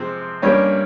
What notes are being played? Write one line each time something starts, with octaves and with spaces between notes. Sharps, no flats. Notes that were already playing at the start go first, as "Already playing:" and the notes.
Already playing: C3 F3 G#3 C4
G2 G3 A#3 C#4 C#5